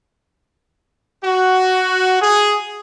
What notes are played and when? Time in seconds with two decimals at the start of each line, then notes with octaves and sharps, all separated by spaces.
1.24 F#4
2.21 G#4